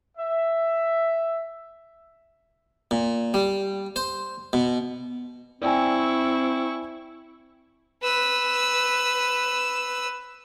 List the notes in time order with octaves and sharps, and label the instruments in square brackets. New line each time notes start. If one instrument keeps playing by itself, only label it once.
[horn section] E5
[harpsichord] A#2
G3
C5
B2
[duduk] C4 [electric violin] E4 C#6 [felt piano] D5 G5 G#5
[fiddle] B4 E6